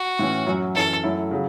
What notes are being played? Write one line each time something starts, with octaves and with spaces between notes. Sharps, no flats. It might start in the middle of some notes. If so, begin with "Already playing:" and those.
Already playing: F#4
A2 E3 C#4
F#2 F#3 C#4
F#2 E3 C#4 A4
F#2 F#3 A3 E4
C#3 F#3